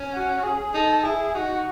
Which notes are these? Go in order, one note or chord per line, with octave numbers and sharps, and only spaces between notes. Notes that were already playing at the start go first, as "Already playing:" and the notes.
Already playing: C#4
F#4
G#4
D#4 A4
E4 G#4
D#4 F#4